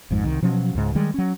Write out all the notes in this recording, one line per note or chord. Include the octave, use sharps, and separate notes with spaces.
G#1 F2 G#2
C2 D#3
B2 F3 F#3 C#4
C#2 G#2
D#3 G3 G#3
F#3 C#4